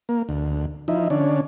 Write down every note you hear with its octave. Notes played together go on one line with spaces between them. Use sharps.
A#3
D2
F3 D#4 E4
D3 C#4 D4